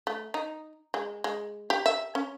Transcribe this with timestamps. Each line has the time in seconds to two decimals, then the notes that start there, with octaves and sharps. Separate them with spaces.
0.07 A3
0.34 D#4
0.94 G#3
1.24 G#3
1.70 G4
1.86 E5
2.15 C#4